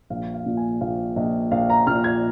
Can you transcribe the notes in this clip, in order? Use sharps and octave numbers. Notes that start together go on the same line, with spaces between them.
A#1 F5
F5
A#2
G#5
A#1 F5
A#1 D#5
A#1 F5
A#5
A#2 F6
G#6